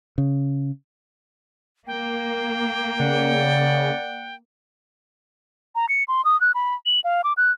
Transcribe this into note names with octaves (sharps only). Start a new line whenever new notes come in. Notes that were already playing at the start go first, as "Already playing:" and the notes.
C#3
A#3 G5
C#3 D5 F#5
A#5
C#7
C6
D#6
F#6
B5
F#7
F5
D6
F#6